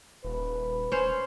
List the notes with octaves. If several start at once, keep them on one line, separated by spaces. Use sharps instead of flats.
D#1 B4
C#4 C5